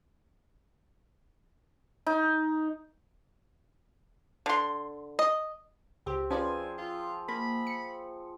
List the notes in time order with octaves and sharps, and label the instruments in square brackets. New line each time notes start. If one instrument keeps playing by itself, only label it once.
[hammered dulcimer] D#4
[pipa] D3 C6
[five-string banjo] D#5
[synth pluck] C#2 G4 [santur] C4
[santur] F3 G#4 [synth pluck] C#4 B4 D5 [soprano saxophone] G#5
[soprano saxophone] F4
[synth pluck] A#3 [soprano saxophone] B5
[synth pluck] C#7